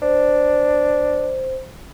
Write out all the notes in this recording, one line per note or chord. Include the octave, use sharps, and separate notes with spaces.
D4 C5